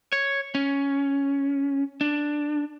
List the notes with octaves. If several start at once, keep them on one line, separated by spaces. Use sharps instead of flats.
C#5
C#4
D4